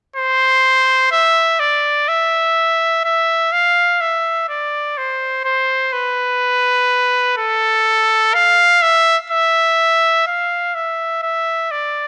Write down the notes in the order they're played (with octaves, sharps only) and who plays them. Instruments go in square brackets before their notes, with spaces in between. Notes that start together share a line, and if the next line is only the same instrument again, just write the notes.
[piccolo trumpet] C5
E5
D5
E5
E5
F5
E5
D5
C5
C5
B4
A4
F5
E5
E5
F5
E5
E5
D5